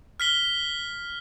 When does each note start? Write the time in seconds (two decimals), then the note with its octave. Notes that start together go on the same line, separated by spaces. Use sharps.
0.20 F6 B6 G7